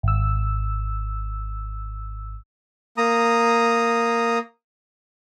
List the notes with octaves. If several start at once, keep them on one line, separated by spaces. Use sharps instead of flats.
G#1 E6
A#3 A#5 D#6